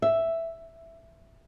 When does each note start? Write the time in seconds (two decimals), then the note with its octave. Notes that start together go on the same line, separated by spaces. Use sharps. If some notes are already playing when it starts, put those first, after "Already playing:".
0.02 E5